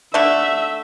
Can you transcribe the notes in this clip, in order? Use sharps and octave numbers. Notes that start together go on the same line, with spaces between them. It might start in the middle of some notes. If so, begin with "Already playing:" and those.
D3 A3 D4 E5